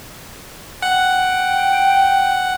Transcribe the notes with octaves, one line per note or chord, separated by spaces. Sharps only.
F#5 G5